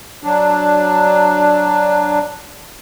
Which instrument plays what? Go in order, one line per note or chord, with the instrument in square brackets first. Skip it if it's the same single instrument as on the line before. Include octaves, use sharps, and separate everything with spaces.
[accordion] F#3 D4